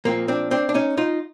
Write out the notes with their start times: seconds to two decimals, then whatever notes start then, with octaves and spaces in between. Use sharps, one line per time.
0.05 A#2 F3 A#3 C4
0.28 C4 D4
0.51 C4 D4
0.69 D4
0.74 C#4 D#4
0.97 D#4 F4